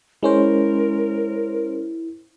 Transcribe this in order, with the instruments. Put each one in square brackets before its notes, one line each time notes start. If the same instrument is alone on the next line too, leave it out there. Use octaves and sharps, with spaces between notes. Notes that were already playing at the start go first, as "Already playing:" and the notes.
[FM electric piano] G#3 C#4 C5 [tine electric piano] E4 [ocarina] A#4